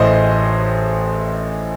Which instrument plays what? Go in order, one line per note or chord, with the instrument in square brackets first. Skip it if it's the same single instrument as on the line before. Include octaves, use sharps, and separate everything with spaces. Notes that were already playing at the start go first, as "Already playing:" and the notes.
Already playing: [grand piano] A1 A2 E3 C5 D#5